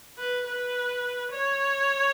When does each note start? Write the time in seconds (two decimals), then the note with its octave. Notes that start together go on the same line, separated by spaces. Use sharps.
0.18 B4
0.46 B4
1.32 C#5